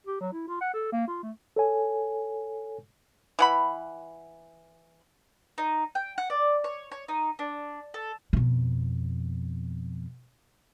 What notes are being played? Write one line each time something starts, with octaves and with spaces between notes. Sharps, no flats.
G4
F#3
E4
F4
F#5
A4
A#3
F4
A3
A4 C#5 G#5
E3 F#5 B5
D#4
G5
F#5
D5
C#5
C#5
D#4
D4
A4
F2 B2